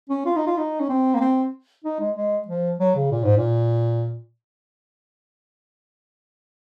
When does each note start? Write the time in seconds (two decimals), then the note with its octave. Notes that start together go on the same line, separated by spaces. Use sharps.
0.10 C#4
0.26 F4
0.36 D#4
0.47 F4
0.58 D#4
0.80 C#4
0.89 C4
1.14 A#3
1.21 C4
1.84 D#4
2.00 G#3
2.16 G#3
2.48 F3
2.80 F#3
2.95 C#3
3.11 A#2
3.24 G#2
3.38 A#2